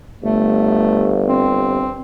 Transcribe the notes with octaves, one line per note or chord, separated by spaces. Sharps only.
G1 A3
C4